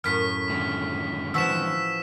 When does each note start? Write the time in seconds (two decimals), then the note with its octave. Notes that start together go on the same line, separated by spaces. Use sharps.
0.04 F#2 A2 F6 B6
0.50 D3 D#3 G#3
1.34 E3 F3 F#4 E6 B6 E7